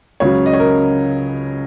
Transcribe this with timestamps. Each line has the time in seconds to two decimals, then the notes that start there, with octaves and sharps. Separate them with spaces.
0.20 C#2 C#3 F#3 C#5
0.46 D#5
0.53 C#5
0.60 A#4